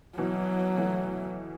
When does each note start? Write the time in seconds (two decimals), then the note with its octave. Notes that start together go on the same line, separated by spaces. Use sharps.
0.18 B2 E3 F#3
0.77 E3 A3